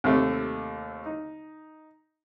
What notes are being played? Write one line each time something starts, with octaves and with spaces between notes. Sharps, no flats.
D#2 C3 A3
D#4